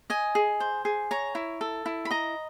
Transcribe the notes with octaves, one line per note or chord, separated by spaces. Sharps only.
D#5 G#5
G#4
C5
G#4
C#5 A#5
E4
A4
E4
B5
D#5 A#5